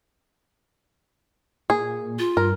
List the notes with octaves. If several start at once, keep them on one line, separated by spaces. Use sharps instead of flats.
A#2 G#4
F4
G2 A#4